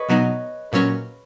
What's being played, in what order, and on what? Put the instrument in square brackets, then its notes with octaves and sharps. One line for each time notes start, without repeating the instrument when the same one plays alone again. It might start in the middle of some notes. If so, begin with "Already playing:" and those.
Already playing: [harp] B4 C#5 D#5 G#5
[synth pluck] B2 F#3 B3 D#4
[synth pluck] A#2 F#3 C#4 [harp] B4